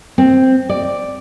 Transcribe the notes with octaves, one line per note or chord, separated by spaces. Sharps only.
C4
D5